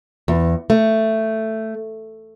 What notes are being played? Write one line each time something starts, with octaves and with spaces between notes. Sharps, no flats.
E2
A3